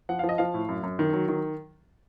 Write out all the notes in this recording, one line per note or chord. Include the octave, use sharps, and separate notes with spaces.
F3 F#5
F3 F5
D#5
F3 F5
A2
F#2
F#2
D#3
F#3
D#3